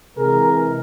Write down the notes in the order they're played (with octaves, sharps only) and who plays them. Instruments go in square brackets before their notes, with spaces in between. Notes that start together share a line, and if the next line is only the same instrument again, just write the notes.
[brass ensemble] C3 E3 G#3 G#4 A#4